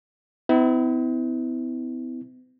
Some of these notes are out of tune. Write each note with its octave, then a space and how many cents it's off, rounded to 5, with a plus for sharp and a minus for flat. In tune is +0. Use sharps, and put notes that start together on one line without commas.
B3 +45 E4 -25